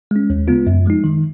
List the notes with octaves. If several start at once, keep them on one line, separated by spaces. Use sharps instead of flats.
G#3 C#4
D#2
C#3 G#3 B3 F4
F#2
F3 G#3 D#4
D#3